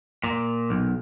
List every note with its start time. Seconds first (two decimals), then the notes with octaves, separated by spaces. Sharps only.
0.24 A#2
0.70 B1